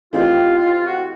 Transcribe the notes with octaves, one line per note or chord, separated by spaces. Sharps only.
E3 A3 C4 D#4 F4 G4
F4
F4
F#4